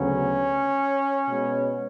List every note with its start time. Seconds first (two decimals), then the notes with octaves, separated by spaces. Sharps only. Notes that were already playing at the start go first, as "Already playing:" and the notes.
Already playing: D2 C#3 F#3 B3 C#4
1.28 B2 G#3 B3